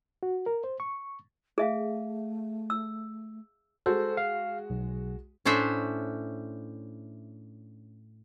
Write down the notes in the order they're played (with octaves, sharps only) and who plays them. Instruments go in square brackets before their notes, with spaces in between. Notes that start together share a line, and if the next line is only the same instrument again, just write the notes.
[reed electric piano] F#4
A#4
C5
C#6
[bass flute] A3 [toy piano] G#4 E5 F5
[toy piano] E6
[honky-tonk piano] G#3 F#4 [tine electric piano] A4 C5
[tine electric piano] F5
B1
[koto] A2 C#4 D4 C5 E5